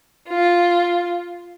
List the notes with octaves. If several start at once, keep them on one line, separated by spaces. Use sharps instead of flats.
F4